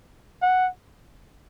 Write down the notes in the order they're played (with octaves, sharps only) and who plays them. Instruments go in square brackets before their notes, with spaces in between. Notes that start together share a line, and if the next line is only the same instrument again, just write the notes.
[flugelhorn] F#5